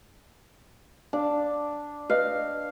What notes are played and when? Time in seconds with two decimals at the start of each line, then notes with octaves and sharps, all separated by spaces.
1.13 D4 F5
2.10 B4 D#5 F5